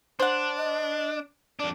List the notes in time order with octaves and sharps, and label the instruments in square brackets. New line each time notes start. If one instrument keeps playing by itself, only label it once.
[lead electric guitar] D4 [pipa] C5 F#5
[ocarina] D#5
[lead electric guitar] F2 D4 [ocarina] D5